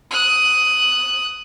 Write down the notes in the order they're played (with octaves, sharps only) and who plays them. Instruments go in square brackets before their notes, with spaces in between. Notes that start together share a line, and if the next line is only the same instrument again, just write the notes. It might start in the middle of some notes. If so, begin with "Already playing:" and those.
[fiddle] D#6 F#6